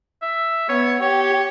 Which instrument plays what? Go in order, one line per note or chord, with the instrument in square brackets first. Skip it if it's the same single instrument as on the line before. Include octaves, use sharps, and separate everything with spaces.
[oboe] E5
[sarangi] B3 [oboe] C#5
[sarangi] G4 [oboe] C#5